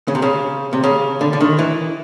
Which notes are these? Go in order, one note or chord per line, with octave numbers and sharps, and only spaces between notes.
C#3
C3
C#3
C3
C#3
D3
D3
D#3
E3